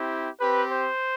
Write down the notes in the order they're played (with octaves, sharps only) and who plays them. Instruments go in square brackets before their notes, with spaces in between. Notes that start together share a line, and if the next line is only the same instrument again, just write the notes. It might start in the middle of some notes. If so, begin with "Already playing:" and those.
Already playing: [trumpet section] C4 E4 G4
C4 G4 B4
C5